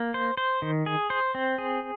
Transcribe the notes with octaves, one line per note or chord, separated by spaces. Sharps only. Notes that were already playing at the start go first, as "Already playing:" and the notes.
Already playing: A#3
C5
C5
D#3
G#4
C5
C4
G#4